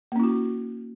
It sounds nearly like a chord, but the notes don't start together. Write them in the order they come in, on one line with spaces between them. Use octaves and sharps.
A#3 C#4 E4 F#4